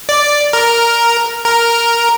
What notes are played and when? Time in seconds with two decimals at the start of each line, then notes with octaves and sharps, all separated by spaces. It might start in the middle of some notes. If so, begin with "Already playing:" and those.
0.09 D5
0.53 A#4
1.45 A#4